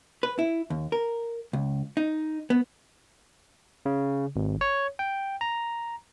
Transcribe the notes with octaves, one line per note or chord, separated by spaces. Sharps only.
B4
E4
D#2
A#4
C#2
D#4
B3
C#3
G#1
C#5
G5
A#5